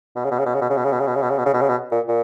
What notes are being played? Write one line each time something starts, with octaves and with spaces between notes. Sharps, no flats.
B2
C#3
B2
C#3
B2
C#3
B2
C#3
B2
C#3
B2
C#3
B2
C#3
B2
C#3
B2
C#3
B2
C#3
B2
A#2
A#2